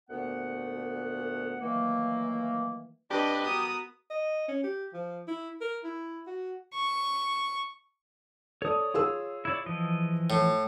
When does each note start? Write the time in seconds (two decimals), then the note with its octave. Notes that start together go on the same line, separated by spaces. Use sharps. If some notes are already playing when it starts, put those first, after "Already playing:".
0.10 D2 A#2 A3 B3 F#5
1.61 D#3 E3 F#3 A3 A#3
3.11 F2 D4 G4 B4 D#5
3.45 B3 F#4 A#4 D#6
4.10 D#5
4.48 C#4
4.64 G4
4.94 F3
5.28 E4
5.61 A#4
5.84 E4
6.27 F#4
6.74 C#6
8.62 A4 C#5 D5 D#6
8.94 F4 G#4 E6
9.45 E4 C#5 D5
9.66 E3 F3 D#5
10.30 A2